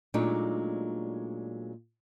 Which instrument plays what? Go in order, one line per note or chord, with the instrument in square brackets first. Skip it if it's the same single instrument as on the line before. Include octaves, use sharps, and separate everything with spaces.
[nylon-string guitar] A#2 F#3 G#3 A3 D4 D#4